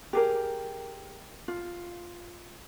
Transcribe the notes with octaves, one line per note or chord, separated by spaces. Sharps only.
G4 G#4 A#4
F4